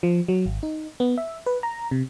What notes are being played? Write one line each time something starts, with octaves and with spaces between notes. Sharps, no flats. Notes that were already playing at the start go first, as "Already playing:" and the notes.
F3
F#3
G#1
D#4
B3
E5
B4
A#5
C3